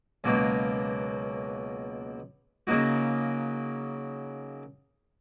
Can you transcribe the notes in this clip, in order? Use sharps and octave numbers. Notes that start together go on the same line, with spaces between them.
C#2 B2 F#3 A#3
C#3 F#3 A#3 D#4 F#4